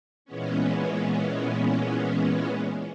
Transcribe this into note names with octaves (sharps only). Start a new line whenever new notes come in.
A#2 E3 G#3 B3 C#4